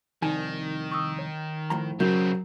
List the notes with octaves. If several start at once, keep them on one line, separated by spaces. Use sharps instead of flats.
C2 F2 D#3 D#4 G#5
C#6 D#6 E6
C#5
A2 F3 A#5
C#3 F#3 C4 C#4 A#4 G6